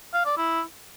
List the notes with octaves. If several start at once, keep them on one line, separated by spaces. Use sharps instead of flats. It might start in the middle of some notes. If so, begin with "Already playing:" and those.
F5
D5
E4